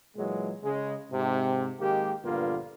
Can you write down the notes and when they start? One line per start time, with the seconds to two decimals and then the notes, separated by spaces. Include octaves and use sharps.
0.17 A#2 E3 F#3 G#3
0.64 C#3 G#3
1.12 G#2 C3
1.80 G#1 D#3 G#3 A#3 G4
2.24 A#1 G2 D3 A#3 B3 F4